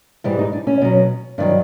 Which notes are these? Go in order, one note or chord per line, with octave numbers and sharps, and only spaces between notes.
G#2 E3 G3 G4
D#4
D4
C#4
B2 F#3
G2 D#3 F#3 D4